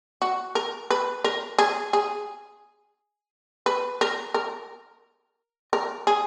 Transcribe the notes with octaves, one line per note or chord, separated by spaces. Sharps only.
F#4
A#4
B4
A#4
G#4
G#4
B4
A#4
A#4
A#4
G#4